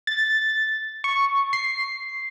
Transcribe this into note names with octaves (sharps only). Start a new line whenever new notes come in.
A6
C#6
C7